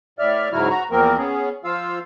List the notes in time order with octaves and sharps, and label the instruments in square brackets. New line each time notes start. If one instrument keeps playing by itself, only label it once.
[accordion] A2 D5 E5 F6
G#2 C#3 F#3 E4 F#4 F6
F#4 A#5
E2 F3 A#3 C4 A#4
B3 C#4 G#4
F3 F4 F5 E6